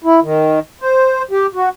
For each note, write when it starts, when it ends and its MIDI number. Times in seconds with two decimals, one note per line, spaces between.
0.04 0.20 64
0.22 0.60 51
0.81 1.23 72
1.31 1.47 67
1.54 1.69 66